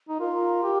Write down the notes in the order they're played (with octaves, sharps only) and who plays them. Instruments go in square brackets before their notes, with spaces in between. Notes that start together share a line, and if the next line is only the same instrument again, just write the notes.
[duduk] D#4
[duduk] F4 [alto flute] A#4
[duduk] G4